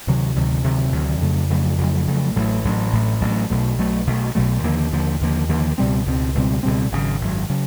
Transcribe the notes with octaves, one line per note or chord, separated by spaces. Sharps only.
D2 C3 D#3 F#3
D2 C3 D#3 F#3
D2 C3 D#3 F#3
D2 C3 D#3 F#3
F2 C#3 F#3 A3
F2 C#3 F#3 A3
F2 C#3 F#3 A3
F2 C#3 F#3 A3
A1 A2 F#3 A3
A1 A2 F#3 A3
A1 A2 F#3 A3
A1 A2 F#3 A3
B1 B2 F#3 A3
B1 B2 F#3 A3
B1 B2 F#3 A3
B1 B2 F#3 A3
D#2 D3 F3 A#3
D#2 D3 F3 A#3
D#2 D3 F3 A#3
D#2 D3 F3 A#3
C#2 B2 G3 C4
C#2 B2 G3 C4
C#2 B2 G3 C4
C#2 B2 G3 C4
G#1 F#2 C#3 F#3
G#1 F#2 C#3 F#3
C#3 F#3